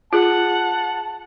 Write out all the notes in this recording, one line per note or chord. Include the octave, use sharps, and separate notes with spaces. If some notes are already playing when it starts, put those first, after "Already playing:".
F4 G#4 F#5 A5